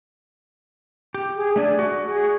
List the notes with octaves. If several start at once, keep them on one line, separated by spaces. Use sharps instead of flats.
G4
G#4
A3 D4 G#4 D5
F#4
G#4